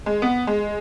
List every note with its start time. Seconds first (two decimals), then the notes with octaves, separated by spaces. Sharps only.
0.06 G#3
0.22 B3
0.47 G#3